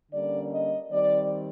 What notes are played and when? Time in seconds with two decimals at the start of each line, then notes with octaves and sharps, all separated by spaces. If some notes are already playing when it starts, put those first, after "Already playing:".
0.12 D3 G3 A#3 C#4 D5
0.51 D#5
0.91 D#3 G3 C4 D5